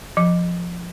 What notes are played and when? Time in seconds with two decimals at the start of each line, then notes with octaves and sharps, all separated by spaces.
0.17 F3